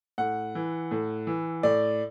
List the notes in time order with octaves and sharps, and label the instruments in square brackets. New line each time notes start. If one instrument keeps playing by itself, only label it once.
[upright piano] A2 F#5
E3
A2
E3
A2 D5